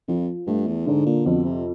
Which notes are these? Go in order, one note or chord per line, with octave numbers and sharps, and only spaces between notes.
F2 F3
G2 A3
E2
G#2 D3
A#2
F2 B2
C3